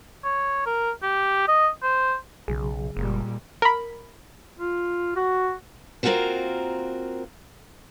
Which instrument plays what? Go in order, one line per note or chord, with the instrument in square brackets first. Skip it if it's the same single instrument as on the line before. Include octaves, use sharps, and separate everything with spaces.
[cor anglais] C#5
A#4
G4
D#5
C5
[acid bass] B1 [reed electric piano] C#3 F#3 G#4
[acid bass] F#1 [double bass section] A#2 G3 G#3
[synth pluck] A#4 B5
[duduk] F4
F#4
[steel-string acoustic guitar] A#3 C4 F4 F#4 A#4 C5